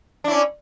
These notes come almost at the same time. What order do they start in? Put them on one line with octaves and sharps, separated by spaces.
D4 E4 C#4